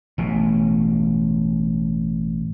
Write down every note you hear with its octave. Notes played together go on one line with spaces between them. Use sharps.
A1 B2